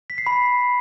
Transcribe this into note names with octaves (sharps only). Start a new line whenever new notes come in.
B6
C7
B5